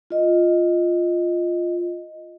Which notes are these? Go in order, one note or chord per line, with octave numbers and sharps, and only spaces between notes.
F4 D#5